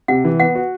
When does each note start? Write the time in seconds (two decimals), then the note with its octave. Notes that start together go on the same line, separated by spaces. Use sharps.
0.08 C3 F#5
0.25 E3
0.40 B3 F#5
0.55 F#4